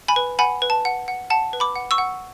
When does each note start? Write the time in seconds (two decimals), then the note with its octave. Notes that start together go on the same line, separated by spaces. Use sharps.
0.08 G#5 B5
0.16 B4
0.39 F#5 G#5 B5
0.62 B4
0.70 A5
0.85 F#5
1.08 F#5
1.30 F#5 A5
1.53 B4
1.60 B5 D6
1.76 F#5
1.91 C#6 E6
1.98 F#5